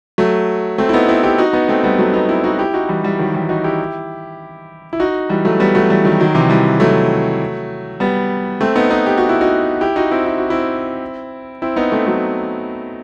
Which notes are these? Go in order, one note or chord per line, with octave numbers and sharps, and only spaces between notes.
F#3 A3
A3 C4
E4
B3 D#4
C4 E4
E4 G4
D#4 F#4
B3 D#4
A3 C4
G3 B3
F#3 A3
B3 D#4
C4 E4
D#4 F#4
E4 G4
D#4 F#4
E3 G3
E3 G3
D#3 F#3
E3 G3
D#4 F#4
E4 G4
E4
D#4 F#4
E3 G3
F#3 A3
G3 B3
F#3 A3
E3 G3
D#3 F#3
D#3 F#3
C3 E3
E3 G3
F#3 A3
G3 B3
A3 C4
B3 D#4
B3 D#4
G4
F#4
E4
D#4 F#4
E4 G4
D#4 F#4
C4 E4
E4
F#4
C4 E4
C4 E4
B3 D#4
A3 C4
F#3 A3